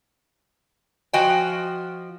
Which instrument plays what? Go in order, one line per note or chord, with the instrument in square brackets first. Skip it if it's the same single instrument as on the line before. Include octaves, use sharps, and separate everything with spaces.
[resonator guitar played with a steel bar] F3 F#4 D#5 G5 G#5